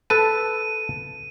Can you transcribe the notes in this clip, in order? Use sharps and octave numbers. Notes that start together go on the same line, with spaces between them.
A4 B4 A5 D#7